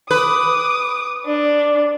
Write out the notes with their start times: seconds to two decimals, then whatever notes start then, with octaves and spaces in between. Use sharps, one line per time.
0.11 B4 D6 D#6
1.26 D4